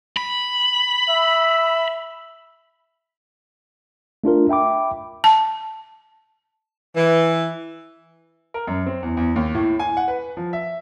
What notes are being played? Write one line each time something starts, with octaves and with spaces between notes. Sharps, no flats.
B5
E5
A3 D4 F4 A#4
E5 G5 B5 D6
A5
E3
A#4
F#2
C4
E2
E2
D#2
A2
G#5
F#5
B4
F3
E5